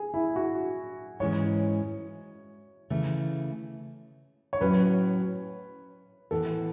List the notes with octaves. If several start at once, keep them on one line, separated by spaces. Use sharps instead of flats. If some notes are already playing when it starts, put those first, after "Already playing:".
Already playing: G#4
E4
F#4
G#2 E3 G#3 C#4 C#5
C#3 E3 A3
C#5
A2 F#3 C#4 B4
A2 E3 B3 A4